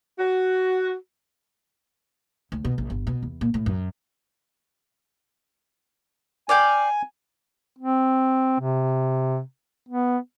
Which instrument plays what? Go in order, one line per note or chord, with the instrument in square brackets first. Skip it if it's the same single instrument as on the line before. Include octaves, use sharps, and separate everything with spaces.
[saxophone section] F#4
[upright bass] D2
B2
A#1
G1
B2
E2
A#2
A2
F#2
[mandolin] D5 F5 G5 [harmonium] G#5
[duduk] C4
C3
B3